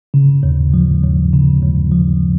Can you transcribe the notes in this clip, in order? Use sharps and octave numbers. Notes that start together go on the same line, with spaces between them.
C#3
D#2
F3
D#2
C#3
D#2
F3